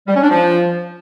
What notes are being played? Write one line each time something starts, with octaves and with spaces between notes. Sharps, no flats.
G3
C#4
D4
F3